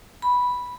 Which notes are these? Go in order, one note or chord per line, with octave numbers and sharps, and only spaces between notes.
B5